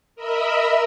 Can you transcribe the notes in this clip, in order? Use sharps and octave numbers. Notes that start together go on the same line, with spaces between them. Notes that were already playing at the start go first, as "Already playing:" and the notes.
A#4 D#5 E5 B5 E6